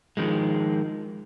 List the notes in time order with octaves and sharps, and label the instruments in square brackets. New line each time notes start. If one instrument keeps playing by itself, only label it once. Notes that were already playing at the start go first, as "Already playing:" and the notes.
[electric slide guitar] D#3 F3 G#3